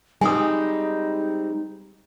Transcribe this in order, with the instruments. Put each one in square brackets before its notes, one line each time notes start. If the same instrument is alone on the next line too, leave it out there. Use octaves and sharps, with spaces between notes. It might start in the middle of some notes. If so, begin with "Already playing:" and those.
[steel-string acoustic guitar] G3 G#3 C4 [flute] D#4 [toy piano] G#5 D#6